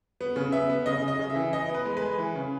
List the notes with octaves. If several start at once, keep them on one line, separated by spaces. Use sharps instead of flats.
B3
C#3
B3 E5
B3
C#3 D#5
C#3
D#5
C#3
E5
E3
E3 D#5
B3
B4
G#3
B4
G#3
E3
C#3